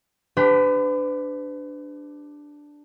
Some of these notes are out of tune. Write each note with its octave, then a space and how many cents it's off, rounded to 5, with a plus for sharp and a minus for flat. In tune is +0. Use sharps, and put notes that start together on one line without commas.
D4 +0 G4 +20 B4 +40